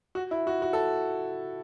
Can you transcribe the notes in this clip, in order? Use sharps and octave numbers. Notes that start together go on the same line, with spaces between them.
F#4
E4
F#4
F#4
A4